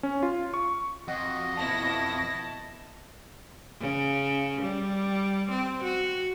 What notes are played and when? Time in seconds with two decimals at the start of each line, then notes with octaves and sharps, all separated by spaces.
0.03 C#4
0.23 F4
0.54 C#6
1.08 F2 F#4 D#5
1.57 B2 E4 A5 A#6
3.80 C#3
4.62 G3
5.50 C4
5.83 F#4